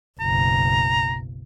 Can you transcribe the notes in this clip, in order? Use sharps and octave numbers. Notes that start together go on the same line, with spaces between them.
F#1 B1 A#5